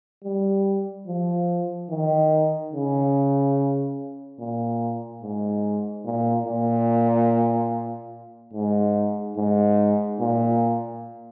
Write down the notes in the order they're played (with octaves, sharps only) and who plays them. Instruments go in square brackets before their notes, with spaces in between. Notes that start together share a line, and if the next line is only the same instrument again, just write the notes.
[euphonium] G3
F3
D#3
C#3
A#2
G#2
A#2
A#2
G#2
G#2
A#2